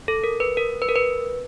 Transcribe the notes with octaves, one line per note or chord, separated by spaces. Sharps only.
A4
A#4
B4
A#4
B4
A#4
B4